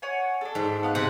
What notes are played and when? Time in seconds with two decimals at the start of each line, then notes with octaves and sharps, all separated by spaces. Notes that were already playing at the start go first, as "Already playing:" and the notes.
0.02 C#5 F#5 G#5
0.41 D4 A4
0.55 G#2
0.83 B3 F5 F#6
0.95 C3 F#5 C6